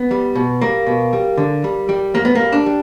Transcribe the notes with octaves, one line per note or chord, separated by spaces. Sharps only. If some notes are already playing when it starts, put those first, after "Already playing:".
Already playing: B3
G3
B2
G3 A#3
B2
G3
D3
G3
G3
F#2 A#3
B3
A#3
G3
D4
G3